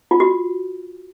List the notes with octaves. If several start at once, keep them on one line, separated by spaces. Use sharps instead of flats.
F4
F#4